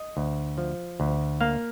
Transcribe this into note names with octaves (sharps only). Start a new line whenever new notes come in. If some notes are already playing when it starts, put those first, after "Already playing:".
Already playing: D#5
D2
F3
D2
A#3 F5